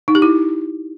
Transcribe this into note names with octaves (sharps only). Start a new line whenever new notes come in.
D#4
G4
E4